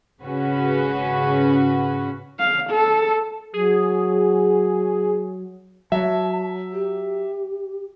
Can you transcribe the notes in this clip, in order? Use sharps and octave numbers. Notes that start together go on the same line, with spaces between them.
G#1 C#3 C#4 F#4 B4
F5
A4
F#3 G#4
F#3 E5 A5
G4